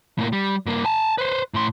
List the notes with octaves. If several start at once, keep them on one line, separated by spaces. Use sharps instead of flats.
A2 A#3
G3
G2 A#3
G#5 A5
B4 C5
A2 C6